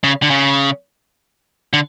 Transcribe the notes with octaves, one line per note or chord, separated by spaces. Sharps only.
C#3
D3
C#3
D3